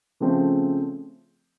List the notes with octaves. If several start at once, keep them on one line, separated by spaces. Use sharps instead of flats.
C#3 F3 A3 C4